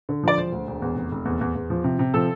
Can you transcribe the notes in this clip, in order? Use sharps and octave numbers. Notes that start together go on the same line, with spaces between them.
D3
F3 D5
E1 C5
D2
E1
E2
F1
F1
E2
E2
E2
F3
C3
C3
F3 A4